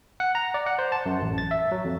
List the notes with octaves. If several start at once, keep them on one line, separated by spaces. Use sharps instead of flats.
F#5
A#5
D5
F#5
C5
A5
F#2
A1
A6
E5
F#3
F2